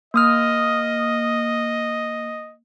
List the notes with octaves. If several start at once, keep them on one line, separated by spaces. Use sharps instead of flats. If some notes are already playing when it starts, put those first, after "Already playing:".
A#3 D#5 D#6 F6